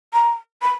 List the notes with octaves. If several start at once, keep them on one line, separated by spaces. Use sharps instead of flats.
A#5
B5